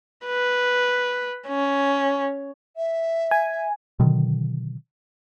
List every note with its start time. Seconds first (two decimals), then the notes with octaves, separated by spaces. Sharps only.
0.26 B4
1.48 C#4
2.77 E5
3.31 G#5
4.00 B2 D3 D#3 F#3